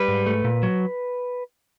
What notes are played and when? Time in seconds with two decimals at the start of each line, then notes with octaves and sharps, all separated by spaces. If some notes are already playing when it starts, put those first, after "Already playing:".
Already playing: G3 B4
0.08 G#2
0.26 A3
0.45 A#2
0.63 F#3